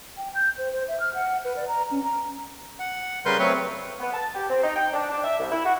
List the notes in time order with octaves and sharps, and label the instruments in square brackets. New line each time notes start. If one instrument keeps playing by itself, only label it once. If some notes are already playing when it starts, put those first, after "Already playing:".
[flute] G5
G6
C5
C5
E5
F6
F#5
B4
D5
A#5
C#4
A#5
[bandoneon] F#5
C#3 G3 A#4 B4 C6 G6
F#3 A3 C4 B4 C#5
[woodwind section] B3
A5
G4
C4
D#4
G5
D4
D4
E5
C2
E4
F#4